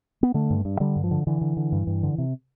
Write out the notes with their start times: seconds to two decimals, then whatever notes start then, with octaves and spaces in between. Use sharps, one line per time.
0.23 B3
0.34 D3 A3
0.50 G2
0.65 G2
0.80 D3 G3
0.96 G2
1.04 F3
1.11 D3
1.27 D3 E3
1.41 D3
1.57 D3
1.72 G2
1.87 G2
2.03 D3
2.18 C3